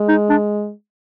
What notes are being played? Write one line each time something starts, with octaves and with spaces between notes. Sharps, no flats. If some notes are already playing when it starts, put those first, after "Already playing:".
Already playing: G#3
D#4
D4